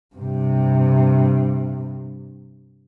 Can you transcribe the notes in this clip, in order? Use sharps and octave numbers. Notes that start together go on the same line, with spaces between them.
G2 C3